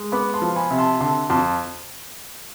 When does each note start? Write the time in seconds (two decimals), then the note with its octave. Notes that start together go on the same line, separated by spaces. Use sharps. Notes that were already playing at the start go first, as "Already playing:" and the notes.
Already playing: G#3
0.12 B3 B5 D6
0.34 A5 C6
0.42 F3
0.56 G#5 B5
0.71 C3
0.78 A5 C6
1.01 D3 A5 C6
1.30 F2 A5 C6